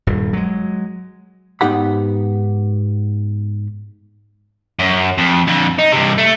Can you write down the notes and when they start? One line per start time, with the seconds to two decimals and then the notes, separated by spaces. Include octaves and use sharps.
0.07 D#1 G2
0.33 F#3 G#3
1.61 G#2 B3 D#4 G4 F#5 B5
4.79 F#2
5.18 F2
5.47 F2 D3
5.78 D#4
5.92 G2 C3
6.18 A3